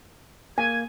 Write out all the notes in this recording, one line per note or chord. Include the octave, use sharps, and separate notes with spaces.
A#3 G#5 G#6